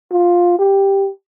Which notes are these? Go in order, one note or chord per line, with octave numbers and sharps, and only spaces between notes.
F4
G4